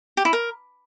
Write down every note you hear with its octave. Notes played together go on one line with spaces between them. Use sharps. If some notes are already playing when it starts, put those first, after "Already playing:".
G4
E4
A#4